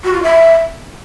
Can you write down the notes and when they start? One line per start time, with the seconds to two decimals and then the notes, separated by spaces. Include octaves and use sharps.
0.04 F#4
0.13 F4
0.23 E5